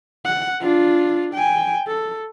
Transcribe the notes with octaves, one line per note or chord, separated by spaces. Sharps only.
F#5
D4 F4
G5 G#5
A4